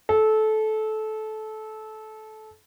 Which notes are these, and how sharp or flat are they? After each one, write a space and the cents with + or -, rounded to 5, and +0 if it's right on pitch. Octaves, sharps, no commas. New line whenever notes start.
A4 -20